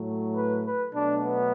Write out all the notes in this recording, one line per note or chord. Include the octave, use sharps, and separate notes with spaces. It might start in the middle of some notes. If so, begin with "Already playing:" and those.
Already playing: A2 F#3 A3
B4
B4
B2 F#3 A3 D4
B3